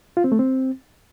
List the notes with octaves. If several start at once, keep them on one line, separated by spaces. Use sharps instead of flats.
F4
C4
A3
C4